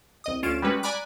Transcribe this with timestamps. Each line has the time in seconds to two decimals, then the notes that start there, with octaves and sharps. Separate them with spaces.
0.24 C2 D#5 D#6
0.43 D2 C#4 F4 D7 E7
0.62 G3 G#3 C#4 F#4 B4
0.83 D5 G#5 A#5 B5 D6 F#6